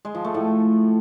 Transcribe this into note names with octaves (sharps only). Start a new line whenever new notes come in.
G#3
F3
A3
A2